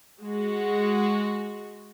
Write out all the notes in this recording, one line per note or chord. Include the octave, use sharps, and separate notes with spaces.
G#3 F#4